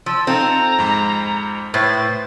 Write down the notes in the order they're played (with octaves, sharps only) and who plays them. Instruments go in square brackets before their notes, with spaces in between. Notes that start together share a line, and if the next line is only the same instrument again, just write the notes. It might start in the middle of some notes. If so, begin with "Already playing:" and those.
[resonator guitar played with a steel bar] F3 [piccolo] E6
[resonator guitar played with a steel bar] C4 [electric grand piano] D#4 F4 A4 [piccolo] A#5
[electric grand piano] F2 G#2
[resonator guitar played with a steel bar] A2 [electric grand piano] B4 C5 D#6 [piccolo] A6